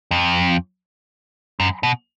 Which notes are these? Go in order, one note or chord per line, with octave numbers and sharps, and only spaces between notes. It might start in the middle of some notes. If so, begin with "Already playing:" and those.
F2
F#2
B2